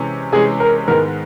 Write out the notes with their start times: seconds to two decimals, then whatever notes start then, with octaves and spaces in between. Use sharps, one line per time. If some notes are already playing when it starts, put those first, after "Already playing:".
Already playing: C3 E3 G#3 C#4
0.32 C3 E3 G#3 C#4 G#4
0.60 A#4
0.88 G#2 D#3 G#3 B3 A#4